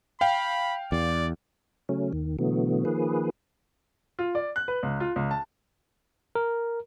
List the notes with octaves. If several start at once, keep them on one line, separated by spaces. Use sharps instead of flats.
F5 G5 B5
E2 D5
C#3 F#3 A3 C#4
D#2 D#3
B2 D3 E3 F#3 A3 B3
D#3 F3 A#3 G#4 B4
F4
D5
F#6
B4
C#2
F4
C#2
A5
A#4